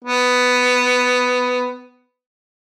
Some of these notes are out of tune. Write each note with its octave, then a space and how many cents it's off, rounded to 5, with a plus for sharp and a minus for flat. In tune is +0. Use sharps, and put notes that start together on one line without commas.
B3 +10